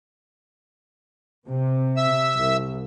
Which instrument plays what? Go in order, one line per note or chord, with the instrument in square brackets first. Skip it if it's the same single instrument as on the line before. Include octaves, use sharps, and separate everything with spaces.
[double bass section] C3
[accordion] E5 E6
[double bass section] C2